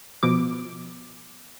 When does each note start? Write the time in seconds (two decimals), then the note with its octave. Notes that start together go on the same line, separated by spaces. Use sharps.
0.23 B2 F3 D6